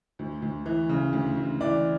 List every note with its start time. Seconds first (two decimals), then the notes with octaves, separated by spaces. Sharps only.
0.19 D2
0.42 D2
0.66 E3
0.89 C#3
1.13 D2
1.37 D2
1.60 E3 D5